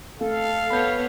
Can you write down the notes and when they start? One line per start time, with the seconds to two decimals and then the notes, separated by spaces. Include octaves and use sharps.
0.21 A3 A4 F5
0.70 B3 C#5 B5 G6